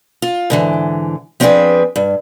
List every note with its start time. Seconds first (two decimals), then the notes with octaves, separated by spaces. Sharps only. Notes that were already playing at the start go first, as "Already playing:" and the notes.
0.22 F4
0.50 G#2 D3 E3
1.40 F3 C4 D4 F#4 G#4 B4
1.96 G2